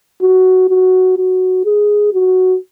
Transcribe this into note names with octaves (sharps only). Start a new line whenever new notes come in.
F#4
F#4
F#4
G#4
F#4